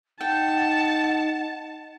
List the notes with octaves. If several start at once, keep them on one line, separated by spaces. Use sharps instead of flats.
D#4 F#5 G5 A5